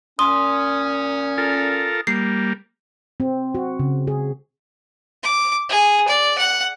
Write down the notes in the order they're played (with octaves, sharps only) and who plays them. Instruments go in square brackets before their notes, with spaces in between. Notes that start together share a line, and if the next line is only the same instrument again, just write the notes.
[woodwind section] A#2 C#4 [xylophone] C6 [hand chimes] D#6
[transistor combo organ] F4 A4 A#4
[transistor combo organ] G3 A#3 [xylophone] C7
[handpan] C4
F#4
C#3
G#4
[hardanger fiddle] D6
G#4
D5
F#5